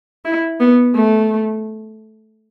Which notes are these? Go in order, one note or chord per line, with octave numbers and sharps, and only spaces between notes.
E4
B3
A3